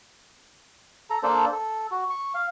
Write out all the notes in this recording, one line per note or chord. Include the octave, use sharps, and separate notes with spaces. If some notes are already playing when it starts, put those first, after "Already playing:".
A4 A#5
A#3 D4 A4 C5
A4
F#4
C#6
F5